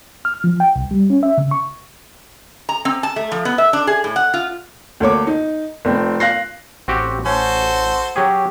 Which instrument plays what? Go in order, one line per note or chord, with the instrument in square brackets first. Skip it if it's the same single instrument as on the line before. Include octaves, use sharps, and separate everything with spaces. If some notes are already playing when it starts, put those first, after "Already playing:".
[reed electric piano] F6
F3
G5
C2
G3
C#4
E5
C#3
C#6
[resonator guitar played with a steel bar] A#5
C4
A5
A3
F3
B3
E5
D4
G#4
A2
F#5
F4
[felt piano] D2 A#3 C#5 D6
D#4
F1 C4
F5 F#6 A#6 C7
[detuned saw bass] A1 [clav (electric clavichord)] C4 F#4 G4
[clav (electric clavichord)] C#4 [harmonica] F#4 A4 C5
[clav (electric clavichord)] F#3 C#4 G#4 [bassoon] G4